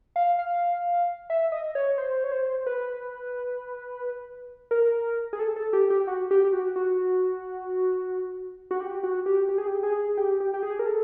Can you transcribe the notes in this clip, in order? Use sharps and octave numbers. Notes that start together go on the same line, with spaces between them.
F5
F5
E5
D#5
C#5
C5
C#5
C5
B4
A#4
G#4
A4
A4
G4
G4
F#4
G4
G4
F#4
F#4
F#4
G4
F#4
G4
G4
G#4
G4
G#4
G4
G4
G4
G#4
A#4
A4